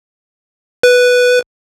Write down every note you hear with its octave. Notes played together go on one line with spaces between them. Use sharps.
B4